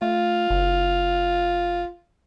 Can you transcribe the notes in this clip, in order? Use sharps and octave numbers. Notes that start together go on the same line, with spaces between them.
A3 F4
F#1